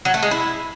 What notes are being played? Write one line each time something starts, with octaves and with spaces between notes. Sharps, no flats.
F#3
A3
G#3
E4